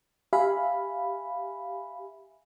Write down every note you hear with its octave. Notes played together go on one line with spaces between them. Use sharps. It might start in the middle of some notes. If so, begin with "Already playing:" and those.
G4 E5 F5 G#5 B5